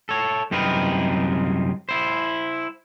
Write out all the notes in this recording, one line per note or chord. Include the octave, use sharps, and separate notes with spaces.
A4 C#5
C2 F#2 C4 D#4 A#4 B4
E4 C5